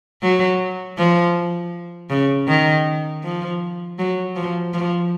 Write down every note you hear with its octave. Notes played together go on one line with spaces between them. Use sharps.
F#3
F3
C#3
D#3
F3
F#3
F3
F3